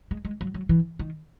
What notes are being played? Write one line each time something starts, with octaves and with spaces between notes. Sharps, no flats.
G#3
G#3
F#3
F#3
E3
D#3